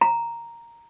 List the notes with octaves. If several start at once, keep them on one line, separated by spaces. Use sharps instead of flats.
A#5